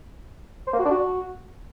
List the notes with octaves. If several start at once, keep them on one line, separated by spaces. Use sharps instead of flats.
C5
A#3
F#4
D4
F#4